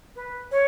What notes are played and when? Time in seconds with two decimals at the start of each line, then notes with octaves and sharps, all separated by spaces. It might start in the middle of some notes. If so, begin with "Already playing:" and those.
0.15 B4
0.51 C#5